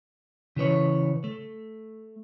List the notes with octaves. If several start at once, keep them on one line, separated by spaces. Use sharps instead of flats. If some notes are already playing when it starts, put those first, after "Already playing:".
C#3 E3 B4 C#5
A3